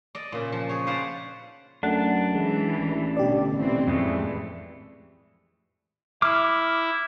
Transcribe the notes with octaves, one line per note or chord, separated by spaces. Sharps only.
D5 D#5
A#2 C#3
F3
G#4 C#5
B4 C5 D5 F5 F#5
F#2 A3 D4 F#5 A6
E3 G#3
A1
B2 D3 G4 D5
B2 E3 C4
F2 A2 E3 G#3 A3
E4 D6 F6